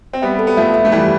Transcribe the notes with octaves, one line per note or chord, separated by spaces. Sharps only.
C4
G3 B3 E5
A4
B3
F3 A3 E5
E5
A3
E3 G3 G4